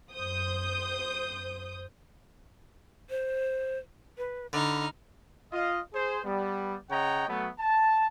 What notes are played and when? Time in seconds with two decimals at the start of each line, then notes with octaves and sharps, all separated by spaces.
0.14 F#2 C5 D#6 G6
3.10 C5
4.18 B4
4.53 D3 D#4 B5 F6
5.53 F4 D#5 F5
5.93 G#4 C5
6.25 G3 B3
6.90 C#3 C#5 D#5 F#5 G5 A#5
7.29 F#3 A3 B3
7.59 A5